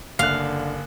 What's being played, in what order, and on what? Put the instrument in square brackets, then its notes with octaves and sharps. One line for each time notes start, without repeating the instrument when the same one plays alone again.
[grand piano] F#1 F#6 [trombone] D3 [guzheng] F5